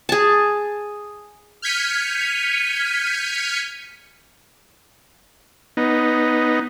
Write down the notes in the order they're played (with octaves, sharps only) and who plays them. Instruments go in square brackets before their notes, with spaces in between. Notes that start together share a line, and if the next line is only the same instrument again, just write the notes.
[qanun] G#4 A5
[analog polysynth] F6 G6 G#6 B6 C#7 D#7
[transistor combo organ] B3 D#4